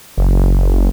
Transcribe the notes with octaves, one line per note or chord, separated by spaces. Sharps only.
F#1